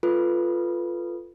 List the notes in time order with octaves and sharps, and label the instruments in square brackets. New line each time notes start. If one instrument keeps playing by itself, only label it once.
[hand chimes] F4 A4 B4